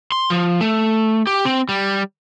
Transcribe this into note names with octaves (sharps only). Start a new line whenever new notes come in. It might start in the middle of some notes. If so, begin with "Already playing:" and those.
C6
F3
A3
G4
C4
G3